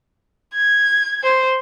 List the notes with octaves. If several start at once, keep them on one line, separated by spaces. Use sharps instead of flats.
G#6
C5